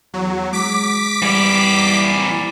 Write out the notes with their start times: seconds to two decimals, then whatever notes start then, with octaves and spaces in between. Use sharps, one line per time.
0.14 E2 F#3
0.53 G#3 D6 B6
1.22 E3 G3 D5